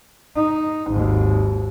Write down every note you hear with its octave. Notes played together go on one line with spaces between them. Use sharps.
D#4
G#1 D#2